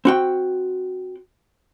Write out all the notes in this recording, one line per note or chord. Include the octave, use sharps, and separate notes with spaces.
C4 F#4 G5